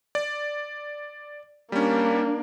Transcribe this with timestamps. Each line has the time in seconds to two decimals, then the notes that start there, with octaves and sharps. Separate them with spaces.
0.15 D5
1.72 G3 A#3 C#4 D4